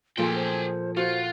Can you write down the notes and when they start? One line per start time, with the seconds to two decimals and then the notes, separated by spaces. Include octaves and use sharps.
0.18 A#2 F3 F4 G#4 A4 G5
0.35 C5
0.97 F4 F#4 C5